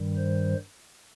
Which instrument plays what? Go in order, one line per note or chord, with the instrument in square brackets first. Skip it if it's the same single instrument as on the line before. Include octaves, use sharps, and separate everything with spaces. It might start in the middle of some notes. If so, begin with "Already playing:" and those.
Already playing: [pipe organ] G2 D#3 G3
C5